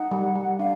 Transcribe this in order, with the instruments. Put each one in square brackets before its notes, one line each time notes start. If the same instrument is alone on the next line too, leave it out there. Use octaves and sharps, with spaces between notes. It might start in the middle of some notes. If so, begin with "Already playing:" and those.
Already playing: [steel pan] D#4 [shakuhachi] F#5
[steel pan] G3
G3
[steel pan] D4 [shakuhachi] F5